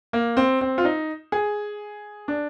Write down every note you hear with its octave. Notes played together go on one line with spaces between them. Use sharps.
A#3
C4
C4
F4
D#4
G#4
D4